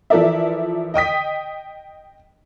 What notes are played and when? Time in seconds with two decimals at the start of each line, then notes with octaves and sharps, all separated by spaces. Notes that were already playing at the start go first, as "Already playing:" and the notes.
0.10 E3 F3 A4 A#4 D5 E5
0.94 D#5 G5 D#6 B6